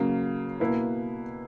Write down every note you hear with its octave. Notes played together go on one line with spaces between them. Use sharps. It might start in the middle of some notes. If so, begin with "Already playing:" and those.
Already playing: C#3 F#3 A#3
B2 A#3 E4 B4